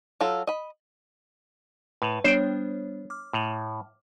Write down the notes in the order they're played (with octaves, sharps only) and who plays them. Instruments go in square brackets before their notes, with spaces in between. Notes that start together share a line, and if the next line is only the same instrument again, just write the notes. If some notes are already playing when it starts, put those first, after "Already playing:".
[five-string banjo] F#3 F4 A4
D#5 B5
[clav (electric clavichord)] A2 [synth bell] B4
[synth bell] G3 B3 D4 [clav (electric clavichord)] C5 G5 [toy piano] C#5
[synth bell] D6 F6
[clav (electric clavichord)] A2